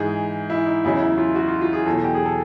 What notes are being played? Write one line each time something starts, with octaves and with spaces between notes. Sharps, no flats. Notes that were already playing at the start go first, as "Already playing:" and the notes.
Already playing: G#2 E3 G#4
E4
D#4
E2 C#3 F#3 E4
E4
F4
F#4
F4
F4
G#4
E2 B2 F#3 A4
G4
G#4
A4